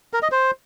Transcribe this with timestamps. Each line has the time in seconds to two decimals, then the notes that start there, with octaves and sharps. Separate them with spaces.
0.13 A#4
0.23 D#5
0.32 C5